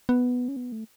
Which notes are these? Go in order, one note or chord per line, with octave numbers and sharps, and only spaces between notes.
B3
C#4
B3
A3